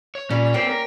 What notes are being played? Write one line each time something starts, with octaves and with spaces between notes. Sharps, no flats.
C#5
A#2 G3 C#4
A#3 B3 C#4 C5 G5
A#4